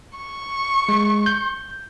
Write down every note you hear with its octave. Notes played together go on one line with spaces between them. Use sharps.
C#6
G#3
G6